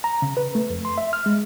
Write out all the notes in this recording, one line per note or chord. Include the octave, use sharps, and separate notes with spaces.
A#5
C#3
B4
A3
F2
C6
E5
F6
G#3